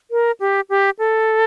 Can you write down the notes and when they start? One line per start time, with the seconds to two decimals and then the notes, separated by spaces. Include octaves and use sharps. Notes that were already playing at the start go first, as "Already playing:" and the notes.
0.11 A#4
0.40 G4
0.70 G4
0.99 A4